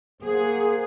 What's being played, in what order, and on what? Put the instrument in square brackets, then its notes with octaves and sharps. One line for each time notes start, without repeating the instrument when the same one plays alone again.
[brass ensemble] A#3 C5 F#5 [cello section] G#4